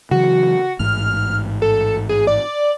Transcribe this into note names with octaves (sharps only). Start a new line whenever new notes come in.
C#3 E3 F#3 F#4
A1 G#2 F6
A4
G#4
D5